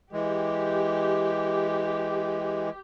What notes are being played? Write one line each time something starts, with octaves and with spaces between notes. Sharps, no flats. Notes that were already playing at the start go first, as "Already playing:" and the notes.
E3 G#3 G4